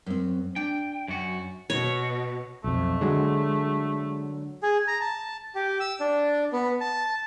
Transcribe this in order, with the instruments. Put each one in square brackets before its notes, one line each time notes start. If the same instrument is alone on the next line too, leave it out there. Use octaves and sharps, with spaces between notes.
[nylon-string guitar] F#2 C4
[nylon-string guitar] D4 [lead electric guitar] G5
[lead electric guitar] F#2 F#4
[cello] B2 [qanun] C#5
[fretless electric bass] B1 F2 [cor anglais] A3
[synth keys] D3 F#3 [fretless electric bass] G#3
[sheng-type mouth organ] G#4
A#5
A5
G4
E6
D4
B3
A5